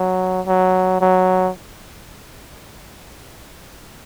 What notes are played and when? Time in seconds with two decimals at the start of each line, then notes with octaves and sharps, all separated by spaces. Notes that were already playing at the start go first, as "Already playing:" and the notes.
Already playing: F#3
0.47 F#3
1.01 F#3